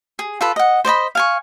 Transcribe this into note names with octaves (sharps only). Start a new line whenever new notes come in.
G#4
F4 A4 B4
D#5 F#5
C5 D5 D#5 B5
F5 G#5 C#6